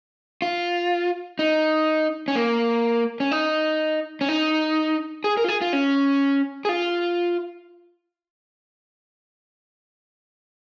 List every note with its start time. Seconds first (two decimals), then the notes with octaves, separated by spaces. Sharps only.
0.42 F4
1.39 D#4
2.28 C#4
2.35 A#3
3.20 C#4
3.31 D#4
4.21 C#4
4.29 D#4
5.24 G#4
5.37 A#4
5.44 F4
5.48 G#4
5.61 F4
5.73 C#4
6.65 G#4
6.69 F4